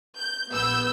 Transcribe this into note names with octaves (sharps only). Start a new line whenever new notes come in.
G6
A#1 B3 E6 G6